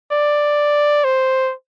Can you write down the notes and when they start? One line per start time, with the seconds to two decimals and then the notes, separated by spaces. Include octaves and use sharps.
0.12 D5
1.04 C5